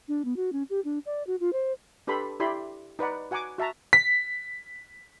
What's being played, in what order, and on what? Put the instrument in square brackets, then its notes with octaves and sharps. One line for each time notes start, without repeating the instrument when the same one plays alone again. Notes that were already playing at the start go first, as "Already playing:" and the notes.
[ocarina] D4
B3
F#4
C#4
G4
D4
D5
F#4
F4
C5
[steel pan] D4 G4 A4 B4 B5 C6
E4 G4 D5 B5 C6
D#4 B4 D5 F#5
F#4 F#5 G#5 A#5 D6
F#4 E5 A5 A#5
[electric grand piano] B6